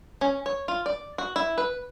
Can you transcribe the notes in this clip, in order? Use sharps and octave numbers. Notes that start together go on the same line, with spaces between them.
C#4
C#5
F4
D5
F#4
E4
B4